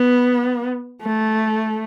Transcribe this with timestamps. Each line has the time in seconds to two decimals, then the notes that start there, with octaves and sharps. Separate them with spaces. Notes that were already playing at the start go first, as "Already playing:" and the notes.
Already playing: B3
1.02 A3